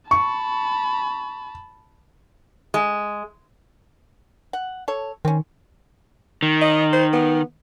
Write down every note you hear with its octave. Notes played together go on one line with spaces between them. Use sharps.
A5 B5 C#6
G#3
F#5
A4 C#5
D#3 C4 C#4
D#3
D#5
C5
B3